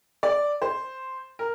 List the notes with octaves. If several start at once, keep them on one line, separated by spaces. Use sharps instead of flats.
D5
C5
A#4